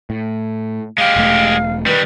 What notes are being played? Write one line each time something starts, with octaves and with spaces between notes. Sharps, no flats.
A2
G#3 G4 F5
E1 A3
D#3 G3 B4